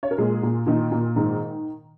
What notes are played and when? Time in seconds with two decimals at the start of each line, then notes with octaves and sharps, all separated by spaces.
0.03 C#5
0.11 A#4
0.18 A#2 G#3 G#4
0.43 A#2
0.66 A#2 D#3 D#4
0.91 A#2
1.16 G#2 D#3 D#4